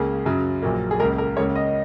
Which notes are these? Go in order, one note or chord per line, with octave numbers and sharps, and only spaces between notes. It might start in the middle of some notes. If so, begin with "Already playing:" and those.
Already playing: C#2 C#3 A#3 G#4
F#2 C#3 F#3
A#1 A#2 F#3 A#3
G#4
C#2 C#3 A#3 A#4
A#4
C#2 C#3 A#3 C#5
D#5